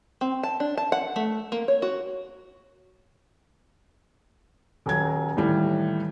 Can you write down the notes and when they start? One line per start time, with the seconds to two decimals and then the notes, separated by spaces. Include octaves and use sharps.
0.21 C4
0.43 A5
0.60 D4
0.77 A5
0.92 F#5
1.16 A3
1.52 A#3
1.68 C#5
1.82 F#4
4.86 D#1 F#3 G#6
5.36 D#2 A2 E3 G3